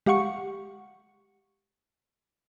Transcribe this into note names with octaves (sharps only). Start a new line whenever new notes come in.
G#3 G4 F5 F#5 C#6 C#7